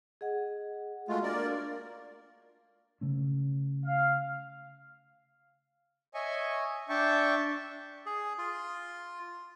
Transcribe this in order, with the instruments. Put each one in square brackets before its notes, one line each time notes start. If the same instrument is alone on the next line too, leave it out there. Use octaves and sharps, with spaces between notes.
[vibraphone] G#4 D#5 F#5
[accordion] G#3 A3 F4 [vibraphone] F#4 F5
[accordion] A#3 A#4 D5 [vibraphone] D4 F5
[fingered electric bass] C#3 A3 C#4
[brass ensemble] F5
[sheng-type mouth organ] C#5 D#5 E5 G#5 C#6
D4 E5 G5 A5 C#6
[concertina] G#4
F4